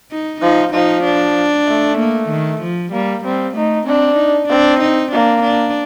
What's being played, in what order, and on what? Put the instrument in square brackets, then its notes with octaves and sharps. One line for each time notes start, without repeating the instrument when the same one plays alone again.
[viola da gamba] D#4
[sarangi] F3 [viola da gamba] D#4
[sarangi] F3 [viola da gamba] D#4
[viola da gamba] D4
[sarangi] A3
[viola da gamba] A#3
D#3
F3
[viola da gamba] G3 [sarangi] A#3
[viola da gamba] G3 [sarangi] C4
[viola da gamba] A3 [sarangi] D#4
[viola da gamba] C4 [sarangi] D4
[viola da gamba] D#4
[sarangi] C4 [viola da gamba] D4
[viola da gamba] D#4
[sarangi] A#3 [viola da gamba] D4
[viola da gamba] D4